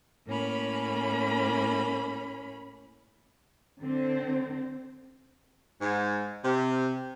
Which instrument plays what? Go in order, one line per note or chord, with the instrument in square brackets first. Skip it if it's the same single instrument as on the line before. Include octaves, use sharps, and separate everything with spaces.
[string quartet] A2 A#3 C#4 B5
[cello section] D3 C4
[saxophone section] G#2
C3